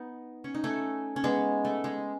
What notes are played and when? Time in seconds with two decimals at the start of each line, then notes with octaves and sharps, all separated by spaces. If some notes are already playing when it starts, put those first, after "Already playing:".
Already playing: B3 D#4
0.44 C#4
0.55 D#4
0.64 A3 C#4
1.16 C#4
1.24 G#3 B3
1.65 A3
1.84 G#3